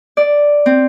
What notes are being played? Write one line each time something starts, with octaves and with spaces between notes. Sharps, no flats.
D5
C4